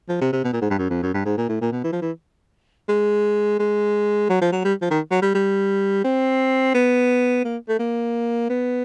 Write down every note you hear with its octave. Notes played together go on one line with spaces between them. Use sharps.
F3
C3
C3
B2
A#2
G#2
G2
F#2
F2
F#2
G2
G#2
A#2
A2
A#2
B2
E3
F3
E3
G#3
G#3
F#3
F3
F#3
G3
F3
D#3
F#3
G3
G3
C4
B3
A#3
A3
A#3
B3